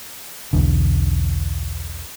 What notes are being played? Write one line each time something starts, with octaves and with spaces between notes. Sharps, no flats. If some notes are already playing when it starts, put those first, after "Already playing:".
B1 E2 D3